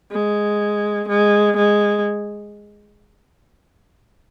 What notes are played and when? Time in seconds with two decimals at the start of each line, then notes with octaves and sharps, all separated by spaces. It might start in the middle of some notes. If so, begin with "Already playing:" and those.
0.11 G#3
1.08 G#3
1.57 G#3